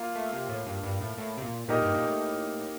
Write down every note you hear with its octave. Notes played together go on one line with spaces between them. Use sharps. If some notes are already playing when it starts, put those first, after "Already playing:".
Already playing: A#3 F4 A#4 F5
A3
C3
A2
G2
G2
A2
A2
C3
A#2
A#2 A#3 D#4 G4 A#4 D#5
G2
A#2
A2